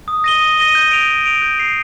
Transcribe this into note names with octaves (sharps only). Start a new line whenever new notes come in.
D#6
A#6 D#7 G7
D#6
A#6 D#7 G7
G6
D7 F7
G6
D7 F7
G6
C7 F7